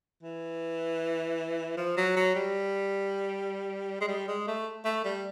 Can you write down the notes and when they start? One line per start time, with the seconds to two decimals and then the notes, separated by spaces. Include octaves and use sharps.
0.23 E3
1.77 F3
1.97 F#3
2.16 F#3
2.35 G3
4.01 G#3
4.08 G3
4.28 G#3
4.48 A3
4.85 A3
5.05 G3